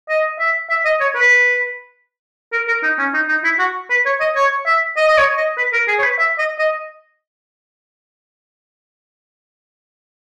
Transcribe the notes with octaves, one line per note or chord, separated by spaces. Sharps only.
D#5
E5
E5
D#5
C#5
B4
A#4
A#4
D#4
C#4
D#4
D#4
E4
F#4
B4
C#5
D#5
C#5
E5
D#5
D#5
C#5
D#5
B4
A#4
G#4
C#5
B4
E5
D#5
D#5